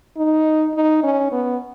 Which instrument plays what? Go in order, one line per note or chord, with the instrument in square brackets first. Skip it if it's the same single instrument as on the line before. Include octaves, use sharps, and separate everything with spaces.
[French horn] D#4
D#4
C#4
B3